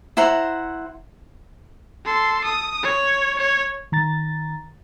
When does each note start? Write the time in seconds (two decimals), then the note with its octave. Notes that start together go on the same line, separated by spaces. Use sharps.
0.17 E4 C5 F#5 A#5
2.05 A4 C6
2.45 D#6
2.83 C#5
3.40 C#5
3.92 D#3 A#5 A6